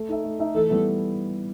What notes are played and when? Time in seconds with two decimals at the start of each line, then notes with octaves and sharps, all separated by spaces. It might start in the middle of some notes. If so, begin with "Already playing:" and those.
Already playing: A3
0.09 D#4 A4 E5
0.24 A3
0.39 D#4 A4 E5
0.54 E3 A3 A4
0.70 G3 B3 E4